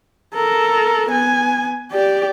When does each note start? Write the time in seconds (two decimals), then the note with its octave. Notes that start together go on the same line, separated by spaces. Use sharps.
0.35 A4 A#4
1.10 B3 G#5
1.92 G4 D5